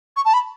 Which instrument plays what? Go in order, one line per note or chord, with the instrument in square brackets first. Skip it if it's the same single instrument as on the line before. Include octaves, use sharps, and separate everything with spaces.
[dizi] C#6
A5
B5